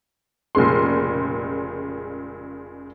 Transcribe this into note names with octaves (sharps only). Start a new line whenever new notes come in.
F1 A#2 C#3 G#3 C6